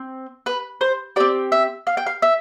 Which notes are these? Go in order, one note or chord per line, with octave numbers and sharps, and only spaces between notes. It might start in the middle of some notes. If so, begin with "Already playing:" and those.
Already playing: C4
B4
C5
C4 G4 D5
E5
F5
G5
F5
E5